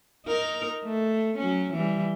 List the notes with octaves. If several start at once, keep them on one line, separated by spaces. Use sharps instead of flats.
D#4 A#4
A3
F#3 C#4
E3 G3